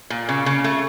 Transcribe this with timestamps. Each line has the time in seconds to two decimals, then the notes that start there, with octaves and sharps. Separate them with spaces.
0.10 A#2
0.29 C#3
0.46 C#3
0.64 A3